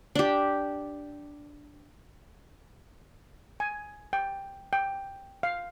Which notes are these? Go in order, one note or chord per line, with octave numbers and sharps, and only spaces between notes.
D4 G4
G#5
G5
G5
F5